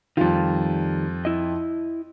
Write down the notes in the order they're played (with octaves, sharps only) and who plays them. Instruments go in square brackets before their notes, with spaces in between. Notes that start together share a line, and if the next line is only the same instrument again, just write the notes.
[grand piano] F2 F4 [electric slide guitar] D#3 G3
[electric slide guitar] E4 D#5